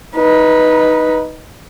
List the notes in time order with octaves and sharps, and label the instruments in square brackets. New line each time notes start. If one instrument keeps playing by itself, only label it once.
[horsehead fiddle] D#4 B4